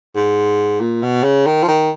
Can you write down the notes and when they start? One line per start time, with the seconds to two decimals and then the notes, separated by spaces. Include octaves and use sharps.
0.15 G#2
0.80 A#2
1.03 B2
1.24 C#3
1.46 D#3
1.63 F3
1.68 D#3